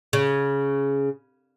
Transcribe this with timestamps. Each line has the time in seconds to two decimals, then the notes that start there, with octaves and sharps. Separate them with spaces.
0.13 C#3